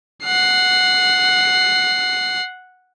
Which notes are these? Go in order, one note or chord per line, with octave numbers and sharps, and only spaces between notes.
F#5 C7